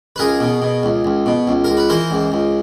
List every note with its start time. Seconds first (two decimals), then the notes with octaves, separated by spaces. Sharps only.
0.16 B4
0.19 C#2 G#4 A#4
0.40 B2
0.62 B2
0.83 C#2
1.05 C#2
1.26 B2
1.47 C#2
1.64 C#2 A#4
1.77 B4
1.89 E3 A#4 C5
2.11 C#2
2.32 C#2